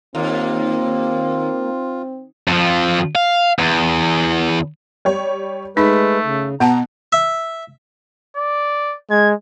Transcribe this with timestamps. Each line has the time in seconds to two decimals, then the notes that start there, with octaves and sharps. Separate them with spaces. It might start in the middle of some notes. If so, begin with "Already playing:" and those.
0.15 D#2 A#3 C4 F4
2.48 F2 F3
3.15 F5
3.59 E2
5.05 G3 G4 C#5
5.77 G#3 A3 D#4 B4 B6
6.24 C#3
6.60 B2 B3 F#5 A5 A#5
7.12 E5
8.36 D5
9.11 G#3 G#6